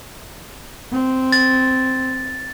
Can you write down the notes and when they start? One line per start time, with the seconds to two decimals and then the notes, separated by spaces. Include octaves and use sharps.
0.91 C4
1.32 A6